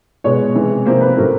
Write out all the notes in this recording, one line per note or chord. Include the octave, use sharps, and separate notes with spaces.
B2 G#3 B3 C#5
C3 E3 G#3
C3 F3 A#3 C5
B4
A2 F#3 A3 C4 A#4